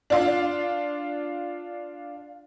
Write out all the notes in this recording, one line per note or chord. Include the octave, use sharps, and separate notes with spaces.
D4 F4